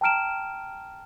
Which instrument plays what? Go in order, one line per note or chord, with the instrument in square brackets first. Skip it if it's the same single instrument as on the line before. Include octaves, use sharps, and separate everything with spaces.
[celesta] G5 A5 A#5 F6 D7 E7